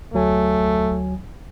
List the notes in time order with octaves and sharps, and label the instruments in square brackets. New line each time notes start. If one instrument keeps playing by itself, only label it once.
[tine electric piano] D2 F#3 G#5 [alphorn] A3